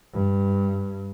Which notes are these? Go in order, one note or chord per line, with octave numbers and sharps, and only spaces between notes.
G2